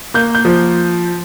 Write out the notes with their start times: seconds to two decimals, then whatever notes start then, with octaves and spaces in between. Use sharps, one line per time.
0.14 A#3 G6
0.35 G6
0.45 F3